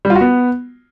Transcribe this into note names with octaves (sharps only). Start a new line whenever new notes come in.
G3
F4
F#4
B3